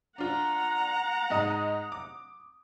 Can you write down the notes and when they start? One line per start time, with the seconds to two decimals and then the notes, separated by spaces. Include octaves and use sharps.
0.18 D4 F4 F#5 A#5
1.30 G#2 D#5 D#6
1.92 D6